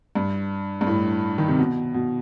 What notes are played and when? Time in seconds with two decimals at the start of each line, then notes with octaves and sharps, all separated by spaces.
0.15 G2
0.81 G2
0.87 A2
1.38 D#3
1.48 C3
1.59 B2
1.94 B2